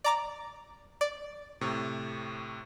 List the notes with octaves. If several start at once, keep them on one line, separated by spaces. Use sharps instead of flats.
D5 A#5 D6
D5
A2 C3 C#6